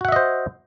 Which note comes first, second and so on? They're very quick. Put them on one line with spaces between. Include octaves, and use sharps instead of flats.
F#4 F#5 E5 D#5 C5